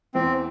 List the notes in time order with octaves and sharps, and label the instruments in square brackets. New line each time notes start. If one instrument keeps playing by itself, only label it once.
[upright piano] E2 E3 [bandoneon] C4